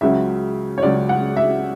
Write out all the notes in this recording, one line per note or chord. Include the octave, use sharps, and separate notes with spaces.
C#2 C#3 F#3 E5
C#5
C#2 C#3 F#3 D5
F#5
E5